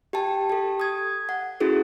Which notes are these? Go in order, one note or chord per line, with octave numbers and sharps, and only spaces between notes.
G4 G5 A5
G4 A4
D#6 G#6
F#5
C#4 E4 F#4 G#4 A4